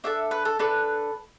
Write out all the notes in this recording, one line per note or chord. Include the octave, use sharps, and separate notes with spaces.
D4 A4 E5
B4
A4
D4 A4 B4